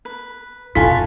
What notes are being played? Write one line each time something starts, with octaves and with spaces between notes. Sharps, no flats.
B4
F2 B2 F4 A4 B4 C#5 G#5 B6